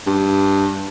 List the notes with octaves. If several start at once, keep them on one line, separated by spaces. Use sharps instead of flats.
G2